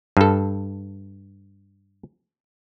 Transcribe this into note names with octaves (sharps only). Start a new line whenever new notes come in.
G2 A4